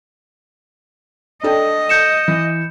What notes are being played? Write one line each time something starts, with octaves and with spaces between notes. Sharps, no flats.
D4 A4 D#5 G5
G6 C#7 E7
E3